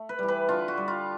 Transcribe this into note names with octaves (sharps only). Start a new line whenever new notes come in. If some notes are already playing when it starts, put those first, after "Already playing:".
Already playing: A3
B4
E3 G3
B4
D3 F4
F#4
G3
F4